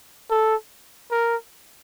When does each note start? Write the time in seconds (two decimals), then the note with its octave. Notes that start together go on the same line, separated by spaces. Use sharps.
0.31 A4
1.12 A#4